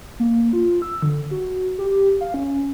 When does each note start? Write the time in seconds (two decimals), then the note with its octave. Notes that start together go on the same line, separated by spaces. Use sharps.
0.20 A#3
0.53 F4
0.82 E6
1.02 D3
1.31 F#4
1.78 G4
2.21 F5
2.34 C#4